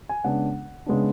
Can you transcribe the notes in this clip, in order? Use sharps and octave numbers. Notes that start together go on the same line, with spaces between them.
G#5
C#3 G#3 B3 D4 F#5
C#3 G#3 B3 D4